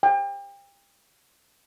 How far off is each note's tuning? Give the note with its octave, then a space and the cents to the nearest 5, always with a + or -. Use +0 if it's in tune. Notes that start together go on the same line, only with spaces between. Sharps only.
G5 +30